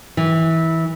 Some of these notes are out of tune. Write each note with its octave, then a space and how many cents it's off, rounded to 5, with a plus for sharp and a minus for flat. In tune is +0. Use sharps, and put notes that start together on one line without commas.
E3 -20